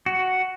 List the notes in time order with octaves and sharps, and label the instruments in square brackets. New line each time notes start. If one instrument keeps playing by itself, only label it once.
[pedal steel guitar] F#4